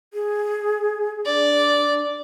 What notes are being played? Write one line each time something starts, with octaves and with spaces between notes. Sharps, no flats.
G#4
D4 D5